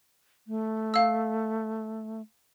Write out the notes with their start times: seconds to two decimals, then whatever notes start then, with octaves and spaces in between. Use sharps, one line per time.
0.47 A3
0.94 F5 E6